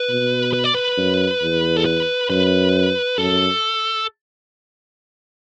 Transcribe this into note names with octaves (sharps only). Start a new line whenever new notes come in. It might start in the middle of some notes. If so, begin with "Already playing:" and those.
Already playing: B4
B2
B4
D5
B4
F#2
E2
A4
B4
F#2 B4
F#2 A4